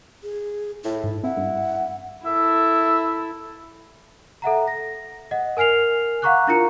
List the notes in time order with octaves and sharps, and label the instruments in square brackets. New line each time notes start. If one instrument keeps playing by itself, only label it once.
[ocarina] G#4
[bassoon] A2 [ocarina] E4
[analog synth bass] G#2
[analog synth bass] C4 [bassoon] E4 [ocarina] F#5
[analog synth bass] G2
[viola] E4 A4 [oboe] E5
[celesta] A4 E5 F#5 A#5
A#6
D#5 F#5
A#4 G#5 F6 C7 F7
F5 F#5 A#5 C#6 D6 F#6
D4 E4 F4 A#4 A#5 C#7